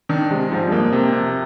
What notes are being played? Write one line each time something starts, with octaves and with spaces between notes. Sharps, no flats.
D#3 D4
C3 G#3
G#2 F3
G2
F2 A#3
C3
C3